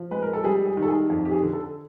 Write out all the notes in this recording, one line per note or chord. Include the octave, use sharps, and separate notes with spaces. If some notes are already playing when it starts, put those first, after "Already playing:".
Already playing: F3
G#3 B4
A#4
A4
G3 G#4
G#4
D#3
A4
G#4
F2
G4
G#4
D3
A4